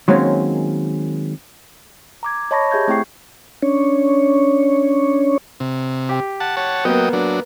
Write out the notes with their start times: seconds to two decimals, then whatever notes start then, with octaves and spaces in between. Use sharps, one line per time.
0.08 D#3 F#3 G#3 A#3 C4 C#4
2.23 A#5 D6 G#6
2.51 C#5 D#5 A5 B5 C#6 A#6
2.71 G4 G#4 E5 G6 G#6
2.88 A3 C4 E4 G5 C#6 C7
3.62 C#4 D4 C#5
5.60 C3
6.09 G4
6.40 F#5 A5
6.57 C#5 F#5 A5
6.85 F#3 A#3 B3 D#5 G5
7.13 F#3 D4